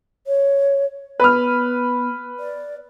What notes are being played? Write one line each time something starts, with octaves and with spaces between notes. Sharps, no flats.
C#5
B3 B4 F6
D5